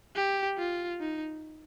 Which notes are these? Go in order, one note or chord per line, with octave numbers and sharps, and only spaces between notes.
G4
F4
D#4